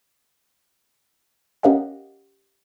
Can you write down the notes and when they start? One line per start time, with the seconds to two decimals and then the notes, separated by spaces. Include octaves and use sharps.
1.63 C#4 G4 A#4 D#5 F5 F#5